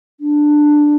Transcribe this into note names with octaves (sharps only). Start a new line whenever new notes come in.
D4